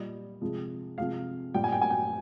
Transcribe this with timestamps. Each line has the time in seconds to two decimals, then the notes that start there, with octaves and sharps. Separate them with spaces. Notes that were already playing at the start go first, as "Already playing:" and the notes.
Already playing: A#2 G3 D#5
0.41 C3 F3 G#3
0.98 C3 F3 G#3 F5
1.54 A#2 G3 G5
1.64 G#5
1.72 G5
1.81 G#5
1.90 G5